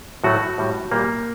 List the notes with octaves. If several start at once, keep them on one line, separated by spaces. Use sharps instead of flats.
A2 F#3 A3 F#4
A2 G3
A#2 G3 A#3